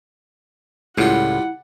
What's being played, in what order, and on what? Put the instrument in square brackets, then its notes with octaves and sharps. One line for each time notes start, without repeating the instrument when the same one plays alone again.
[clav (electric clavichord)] C#2 A2 [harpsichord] G3 F4 [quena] E4 [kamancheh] F#5